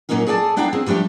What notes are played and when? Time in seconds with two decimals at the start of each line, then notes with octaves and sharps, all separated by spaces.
0.09 A#2 F#3 A#3 C#4 D#4 F4
0.27 G#4 A4 D5 G5 A5
0.56 B3 D4 E4 F5 G5 A#5
0.73 C4 G#4
0.86 F3 G3 A3 D4 G4